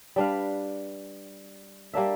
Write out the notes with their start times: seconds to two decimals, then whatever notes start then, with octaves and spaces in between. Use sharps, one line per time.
0.16 G3 D4 B4 F5
1.94 G3 A#3 D4 E5